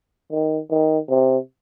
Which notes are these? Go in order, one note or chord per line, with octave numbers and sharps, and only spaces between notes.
D#3
D#3
C3